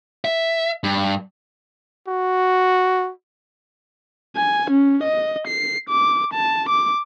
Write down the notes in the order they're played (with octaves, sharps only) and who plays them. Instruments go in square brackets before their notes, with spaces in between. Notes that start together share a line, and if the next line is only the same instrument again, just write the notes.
[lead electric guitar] E5
G2
[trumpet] F#4
[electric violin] G#5
C#4
D#5
C7
D6
A5
D6